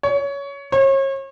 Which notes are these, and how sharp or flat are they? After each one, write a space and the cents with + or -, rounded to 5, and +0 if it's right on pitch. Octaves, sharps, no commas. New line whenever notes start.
C#5 +20
C#5 -35